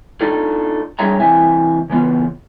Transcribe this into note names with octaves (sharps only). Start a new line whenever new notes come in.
D4 D#4 F4 A4
G3 D4 G#4 C#5 E5 A#5
C3 E3 E5 G#5
C#3 E3 B3 F4